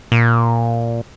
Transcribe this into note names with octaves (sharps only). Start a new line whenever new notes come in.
A#2